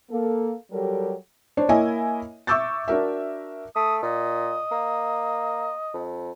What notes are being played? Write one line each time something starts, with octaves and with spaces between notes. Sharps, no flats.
A#3 A4
F#3 G3 G4 A4 A#4
D4 C5 C#5
A#3 E4 C#5 D#5 E5 G#5
E5 C#6 D6 E6 G6 A6
D4 F#4 A#4 E5
A3 D#6
A#2 D#5
A#3
F2